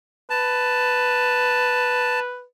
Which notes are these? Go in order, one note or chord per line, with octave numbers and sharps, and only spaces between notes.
B4 A5